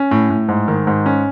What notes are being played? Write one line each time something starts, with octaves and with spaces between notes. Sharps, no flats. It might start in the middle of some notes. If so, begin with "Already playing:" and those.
Already playing: C#4
A2
A2
G#2
D#3
G#2
C#4